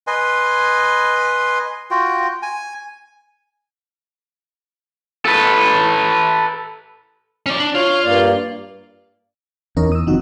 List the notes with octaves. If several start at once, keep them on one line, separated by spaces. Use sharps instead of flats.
B4 D#5 G#5 C6
F4 F#4 G5
G#5
A4 B4
C#4 D5
D4
F4 C#5
G2 A#3 D5
E2 C#4 D#4 A#4
D#6 E6
F1 D#3 F3 C4 D#4 F#4